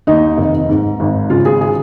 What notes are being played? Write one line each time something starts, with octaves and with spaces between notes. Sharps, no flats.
D#2 D#4
F1
G#2
G#1
C#3 F4
G#4
G#4